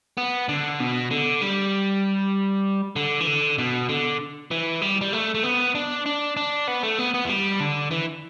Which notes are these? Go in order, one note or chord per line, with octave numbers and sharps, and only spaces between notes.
B3
D3
B2
D3
G3
D3
E3
D3
B2
D3
E3
G3
G3
A3
A3
B3
D4
D4
D4
B3
A3
B3
B3
E3
G3
D3
E3